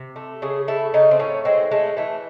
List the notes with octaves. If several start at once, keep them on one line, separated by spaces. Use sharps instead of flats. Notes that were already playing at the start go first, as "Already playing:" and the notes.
Already playing: C3
A3
C#3 G#4
A3 E4
C#3 D#4
C4
A2 C#4
G#3 C4
G#3 A3
E3 A3